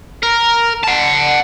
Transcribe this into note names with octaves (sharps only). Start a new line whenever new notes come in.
A#4
F#5 A5